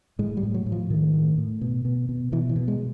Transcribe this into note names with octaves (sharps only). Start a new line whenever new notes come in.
A2 G#3
G3
A2
F#3
A2
F3
A2 D#3
A2
A2
B2
B2
B2
B2 E3
E3
B2
G#3